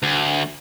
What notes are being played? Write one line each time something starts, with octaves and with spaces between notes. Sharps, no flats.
D2